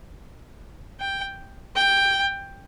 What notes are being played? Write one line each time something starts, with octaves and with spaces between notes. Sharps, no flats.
G5
G5